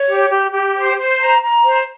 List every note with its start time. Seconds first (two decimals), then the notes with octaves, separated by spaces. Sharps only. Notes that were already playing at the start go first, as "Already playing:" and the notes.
Already playing: C#5
0.08 G4
0.30 G4
0.52 G4
0.75 C5
0.97 C5
1.20 A#5
1.42 A#5
1.64 C5